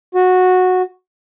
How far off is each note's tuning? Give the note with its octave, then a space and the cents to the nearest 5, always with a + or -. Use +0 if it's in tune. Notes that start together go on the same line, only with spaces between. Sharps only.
F#4 -10